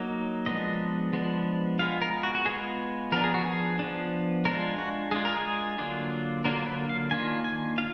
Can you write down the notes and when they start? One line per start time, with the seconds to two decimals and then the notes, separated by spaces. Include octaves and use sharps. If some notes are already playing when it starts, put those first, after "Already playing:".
Already playing: F#3 A#3 D#4
0.46 F3 G#3 B3 D4 D#5
1.13 F3 G#3 B3 D4
1.79 G#3 B3 F4 F5
2.02 A#4
2.23 F#4
2.35 F#4
2.45 G#3 B3 F4 G#4
3.12 F3 B3 D4 A#4
3.24 G#4
3.34 F#4
3.45 G#4
3.79 F3 B3 D4
4.45 G#3 D4 F4 A#4
4.78 F#4
5.11 G#3 D4 F4 G#4
5.25 A#4
5.37 G#4
5.78 D3 F#3 A#3 D4 F4
6.44 D3 F#3 A#3 D4 F4 A#4
6.66 B4
6.89 F5
7.11 D#3 A#3 D4 F4 G#5
7.44 G#5
7.78 F4 F5